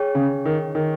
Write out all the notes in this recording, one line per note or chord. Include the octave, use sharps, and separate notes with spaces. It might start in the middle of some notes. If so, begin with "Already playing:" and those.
Already playing: G#4 C#5 G5
C#3
D#3
D#3